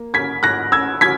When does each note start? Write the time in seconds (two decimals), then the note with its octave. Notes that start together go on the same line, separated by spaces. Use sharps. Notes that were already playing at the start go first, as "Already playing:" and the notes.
Already playing: A#3
0.14 G#6 B6
0.43 F#6 A#6
0.72 E6 G#6
1.01 G#6 B6